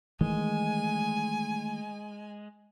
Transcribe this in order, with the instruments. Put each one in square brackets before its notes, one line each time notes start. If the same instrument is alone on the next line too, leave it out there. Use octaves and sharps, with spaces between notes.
[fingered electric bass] D#3 E3 A3 [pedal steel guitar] G#3 [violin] G#5